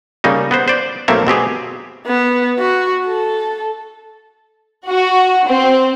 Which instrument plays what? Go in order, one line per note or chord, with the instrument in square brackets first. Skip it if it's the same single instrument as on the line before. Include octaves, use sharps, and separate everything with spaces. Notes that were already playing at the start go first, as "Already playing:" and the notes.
[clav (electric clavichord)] C#3 G3 A#3 D#4
B3 B4 C5
C5 D5
B1 A3 A#3 C4 C#5 E5
B2 C4 G4 G#4
[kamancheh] B3
F#4
A4
[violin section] F#4
C4